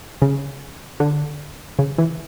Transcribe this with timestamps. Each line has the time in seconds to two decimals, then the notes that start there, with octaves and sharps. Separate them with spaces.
0.22 C#3
1.00 D3
1.79 C#3
1.98 E3